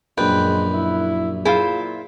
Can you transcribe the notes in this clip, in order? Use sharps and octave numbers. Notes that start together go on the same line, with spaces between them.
A#1 F#2 G#3 B4 G5
E4
A#2 E4 F4 G#4 C5 F5